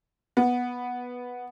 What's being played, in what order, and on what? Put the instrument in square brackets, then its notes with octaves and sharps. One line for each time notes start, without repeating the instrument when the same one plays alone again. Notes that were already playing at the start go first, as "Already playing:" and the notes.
[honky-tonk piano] B3